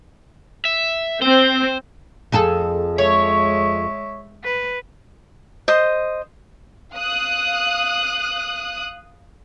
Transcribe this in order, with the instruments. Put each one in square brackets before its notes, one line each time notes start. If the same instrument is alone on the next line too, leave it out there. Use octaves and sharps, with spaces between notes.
[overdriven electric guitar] E5
[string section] C4 [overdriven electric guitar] C5
[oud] F2 G#4 A4
[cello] G#3 E5 [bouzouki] C#5
[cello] B4
[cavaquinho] C5 D#5 D#6
[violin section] F5 D#6 F#6